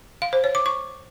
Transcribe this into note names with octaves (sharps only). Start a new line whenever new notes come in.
F5
C5
C#5
D6
C#6